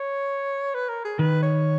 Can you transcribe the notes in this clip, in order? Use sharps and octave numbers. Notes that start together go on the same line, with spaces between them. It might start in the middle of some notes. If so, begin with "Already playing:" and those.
Already playing: C#5
B4
A#4
G#4
D#3 B4
C#5